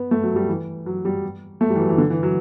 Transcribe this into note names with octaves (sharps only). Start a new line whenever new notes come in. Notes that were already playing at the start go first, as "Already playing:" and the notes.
Already playing: B3
A3
F#3
G3
E3
F#3
G3
A3
G3
E3
F#3
E3
D3
E3
F#3